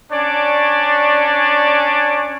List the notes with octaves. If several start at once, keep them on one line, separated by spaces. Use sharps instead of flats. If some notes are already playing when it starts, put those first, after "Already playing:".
C#4 D4 C#5 D5